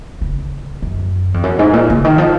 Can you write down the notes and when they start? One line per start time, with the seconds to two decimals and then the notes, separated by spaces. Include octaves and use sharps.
0.21 C#3
0.82 F#2
1.34 F2
1.43 F#2
1.59 G#2
1.73 A#2
1.90 C#3
2.04 D#3
2.18 F3